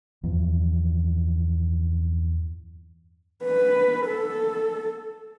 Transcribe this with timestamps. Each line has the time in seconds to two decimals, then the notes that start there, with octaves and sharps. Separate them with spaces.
0.23 E2 G2 E3 F3
3.44 B4
4.07 A4